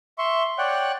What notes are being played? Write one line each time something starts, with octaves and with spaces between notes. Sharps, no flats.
E5 C6 C#6
C#5 D5 F#5 G5 F#6